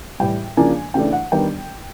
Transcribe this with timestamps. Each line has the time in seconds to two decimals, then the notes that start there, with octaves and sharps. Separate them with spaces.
0.20 A2 E3 G3 G5
0.57 C#3 F3 A#3 D4 G#5
0.94 C#3 E3 A3 D4 G5
1.13 F#5
1.32 D#3 G3 B3 D4 G5